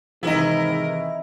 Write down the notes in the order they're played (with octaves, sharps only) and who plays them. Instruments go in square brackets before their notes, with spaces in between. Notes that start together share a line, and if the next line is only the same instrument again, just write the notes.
[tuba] G#2 [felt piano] C3 D#3 E3 [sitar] E4 D#5 [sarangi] A#4